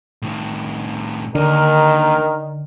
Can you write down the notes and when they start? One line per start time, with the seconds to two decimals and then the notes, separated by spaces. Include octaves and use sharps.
0.22 A2 D#3
1.35 D#2 D3 D#3 A#4